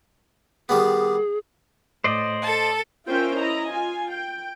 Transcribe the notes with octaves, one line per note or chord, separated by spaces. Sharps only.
D#3 G3 B3 G#4
A2 C5 D5 D#5
A4 A5
C#4 F4 A#4 C5 E5 G5
E4 D#5 A#5
F4 G#5
G5